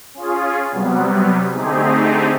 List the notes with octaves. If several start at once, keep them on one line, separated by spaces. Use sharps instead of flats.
C#4 F4 G#4
C3 F#3 G3 B3
D3 A3 C4 D#4 G4 G#4